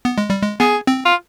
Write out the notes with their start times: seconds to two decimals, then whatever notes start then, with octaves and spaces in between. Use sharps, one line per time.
0.05 B3
0.18 G#3
0.30 G3
0.42 G#3
0.60 B3 G#4
0.87 C4
1.05 F4